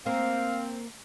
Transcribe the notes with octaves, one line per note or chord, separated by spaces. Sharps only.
A#3 C4 F5